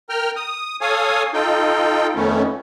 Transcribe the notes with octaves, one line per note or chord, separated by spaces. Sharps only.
A#4 G5 F6
D#6
A4 C#5 F5 G#5 D#6
D#4 F4 A4 G5
F2 D#3 A3 B3 C#4